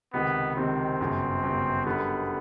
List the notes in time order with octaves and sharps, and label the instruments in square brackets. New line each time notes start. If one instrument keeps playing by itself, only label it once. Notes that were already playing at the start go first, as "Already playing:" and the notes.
[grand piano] C#2 C3 D#3 [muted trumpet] B3
[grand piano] C#2 C3 D#3 [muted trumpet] C4
[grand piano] G1 F#2 C#3
G1 F#2 C#3
[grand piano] F#2 D3 G3 [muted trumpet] B3